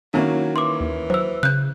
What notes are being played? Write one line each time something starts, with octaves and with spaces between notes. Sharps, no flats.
D#3 F#3 A#3 C#4 E4
E3 C6 D6
D#2
F#3 C5 E6
C#3 F#6 G6